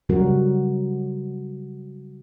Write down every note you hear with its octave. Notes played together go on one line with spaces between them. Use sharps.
C#3 F#3 G3 C#4 F#4 A#4